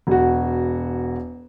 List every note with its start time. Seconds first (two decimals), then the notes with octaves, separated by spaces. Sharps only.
0.07 E1 F#4